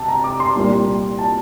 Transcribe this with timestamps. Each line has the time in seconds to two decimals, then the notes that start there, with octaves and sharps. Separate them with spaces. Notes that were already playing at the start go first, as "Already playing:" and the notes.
Already playing: C3 A5
0.08 A#5
0.24 D6
0.40 C6
0.56 C2 A#2 G3 A#3
1.19 A5